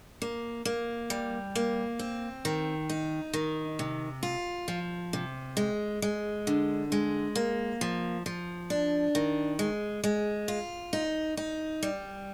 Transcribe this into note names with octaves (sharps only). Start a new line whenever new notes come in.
A#3
A#3
G3
A#3
C4
D#3
D#4
D#3
C3
F4
F3
C3
G#3
G#3
D3
G#3
A#3
F3
F3
D4
D#3
G#3
G#3
F4
D#4
D#4
G3